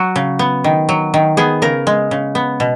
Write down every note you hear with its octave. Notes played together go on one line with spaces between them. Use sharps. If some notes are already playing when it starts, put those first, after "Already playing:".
Already playing: F#3 F#4
C#3
B3
D#3
F#3
D#3
B3 G#4
C#3 A#4
G#3
C#3
B3
B2